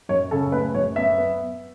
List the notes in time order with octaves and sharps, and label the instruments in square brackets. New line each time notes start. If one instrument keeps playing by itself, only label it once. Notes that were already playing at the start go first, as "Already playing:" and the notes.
[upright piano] F#2 C#5
C#3 A4
A3 B4
F#2 C#5
B3 E5
B3